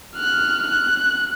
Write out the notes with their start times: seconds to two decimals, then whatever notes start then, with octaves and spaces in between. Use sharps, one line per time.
0.16 F6 F#6
0.68 F#6